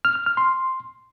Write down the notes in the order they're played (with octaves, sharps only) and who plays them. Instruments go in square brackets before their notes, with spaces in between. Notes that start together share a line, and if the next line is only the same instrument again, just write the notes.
[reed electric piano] F6
F6
F6
C6